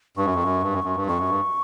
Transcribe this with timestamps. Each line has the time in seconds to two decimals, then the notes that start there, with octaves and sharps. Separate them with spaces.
0.17 G2 C#6
0.25 F#2
0.35 F2
0.43 F#2
0.62 G2
0.73 F#2
0.84 F#2
0.96 G2
1.06 F2 C#6
1.18 F#2
1.29 G2